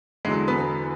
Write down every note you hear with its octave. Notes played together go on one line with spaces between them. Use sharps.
E2 D3 F#3 G#3
B3